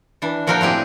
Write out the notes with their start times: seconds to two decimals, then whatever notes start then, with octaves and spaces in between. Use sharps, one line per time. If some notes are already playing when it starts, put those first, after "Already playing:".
0.22 E3 D4
0.47 A#2 F3 F#4 A#4 F5 G5
0.61 A2 C4 G4 G#4